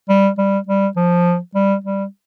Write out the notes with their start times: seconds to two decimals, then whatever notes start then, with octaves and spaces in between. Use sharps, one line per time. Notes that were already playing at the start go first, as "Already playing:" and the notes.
0.09 G3
0.38 G3
0.67 G3
0.96 F3
1.55 G3
1.84 G3